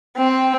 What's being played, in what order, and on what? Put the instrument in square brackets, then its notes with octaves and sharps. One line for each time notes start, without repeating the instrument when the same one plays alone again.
[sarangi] C4